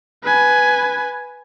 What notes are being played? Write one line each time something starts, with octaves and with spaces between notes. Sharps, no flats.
B4 G#5